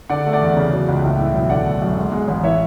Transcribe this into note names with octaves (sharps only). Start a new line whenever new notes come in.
D3 D5 F#5
A3
D5 F#5
E2
C#3
F#3
C#2
A2
E3
B1
D3 D5 F#5
A3
F#2
G#2
G#3
A1
E3 C#5 E5